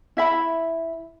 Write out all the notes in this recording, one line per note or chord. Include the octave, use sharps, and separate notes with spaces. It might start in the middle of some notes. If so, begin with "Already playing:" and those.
E4 E5 B5